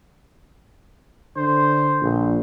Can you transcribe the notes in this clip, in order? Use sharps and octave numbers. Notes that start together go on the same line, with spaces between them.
D3 C5
A#1